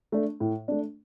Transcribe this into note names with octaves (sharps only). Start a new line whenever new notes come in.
A3 D4
A2
A3 D4